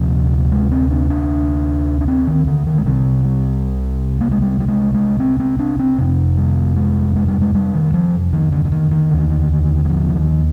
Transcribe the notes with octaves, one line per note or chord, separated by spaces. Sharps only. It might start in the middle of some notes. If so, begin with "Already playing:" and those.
Already playing: D2 C3 F3
G#3
C4
D4
D4
D4
C4
D#3
D3
D#3
G#3
C2 C3 G3
G3
A#3
G#3
G3
G3
G#3
G#3
C4
C4
D4
C4
F2 C3
G3
G#3
G#3
G3
G#3
G3
D#3
F3
D#3
D3
D3
D#3
D#3
D#2 D3
G3
F3
D3
D#3